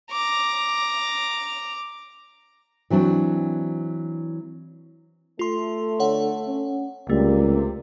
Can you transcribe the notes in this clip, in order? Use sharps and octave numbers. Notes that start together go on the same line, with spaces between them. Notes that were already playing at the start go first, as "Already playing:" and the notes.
A#5 D6
E3 F#3 C4 D4
A3 F4 C6
D3 C#5 F#5
C#4
C#2 C3 G3 A3 A#3